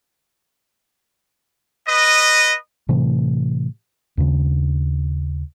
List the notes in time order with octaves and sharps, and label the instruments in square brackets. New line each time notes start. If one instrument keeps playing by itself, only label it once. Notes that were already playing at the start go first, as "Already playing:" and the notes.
[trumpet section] B4 D#5
[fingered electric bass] A2 C3 E3 A3
D#2 C#3